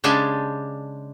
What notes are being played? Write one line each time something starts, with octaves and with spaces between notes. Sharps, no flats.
C#3 G#3 D4 G4 G#5 A5